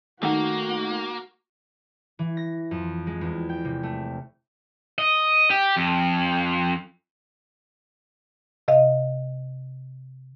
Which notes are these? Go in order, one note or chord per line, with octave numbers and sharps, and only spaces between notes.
D#3 A3 A#3 F#4 F#5
E3
A#6
F2
G#3
E2
G5
C3
A3
D#5
G4
F2
C3 D#5 F5